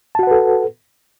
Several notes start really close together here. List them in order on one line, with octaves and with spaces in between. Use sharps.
A5 F#4 F#5 B4 A4